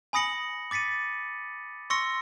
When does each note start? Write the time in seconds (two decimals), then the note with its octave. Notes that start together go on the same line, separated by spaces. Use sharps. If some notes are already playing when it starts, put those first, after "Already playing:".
0.13 G#5 B5 D#6 A#6 C#7 F#7
0.71 D6 A6 B6 C#7 D#7
1.90 C6 C#6 E6 A#6 C#7